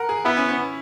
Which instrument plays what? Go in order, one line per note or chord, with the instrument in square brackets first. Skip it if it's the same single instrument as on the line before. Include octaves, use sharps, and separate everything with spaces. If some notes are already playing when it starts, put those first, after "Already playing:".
Already playing: [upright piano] A#4 F#5
G#4
[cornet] B3 [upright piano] E4
[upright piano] C#4
C#4